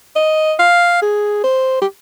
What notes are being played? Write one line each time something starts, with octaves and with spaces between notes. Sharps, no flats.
D#5
F5
G#4
C5
G4